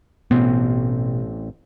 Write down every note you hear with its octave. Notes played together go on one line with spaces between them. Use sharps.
A1 B2 B3 C4